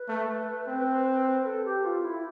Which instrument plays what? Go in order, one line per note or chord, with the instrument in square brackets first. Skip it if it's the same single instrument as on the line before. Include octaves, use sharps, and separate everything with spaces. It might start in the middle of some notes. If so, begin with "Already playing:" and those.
Already playing: [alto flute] B4
[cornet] A3
C4
[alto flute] B4
A4
G4
F4
E4